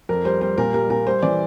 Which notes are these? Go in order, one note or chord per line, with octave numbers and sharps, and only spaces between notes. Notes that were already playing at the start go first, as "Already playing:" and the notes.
F2 A#4
G3 C5
G3 C5
A#2 A#4
G3 A#4
A#2 A#4
G3 C5
E3 D5